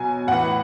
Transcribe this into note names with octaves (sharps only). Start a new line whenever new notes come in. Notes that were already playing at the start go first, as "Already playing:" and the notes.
Already playing: B2 F#3 G#5
A2 E3 F#5